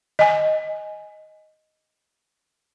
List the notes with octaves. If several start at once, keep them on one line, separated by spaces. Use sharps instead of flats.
D#5 G#5